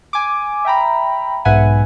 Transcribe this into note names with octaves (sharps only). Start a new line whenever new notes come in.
G#5 D6
E5 G5 A#5 B5
B1 G#2 B4 E5 F#5 G#5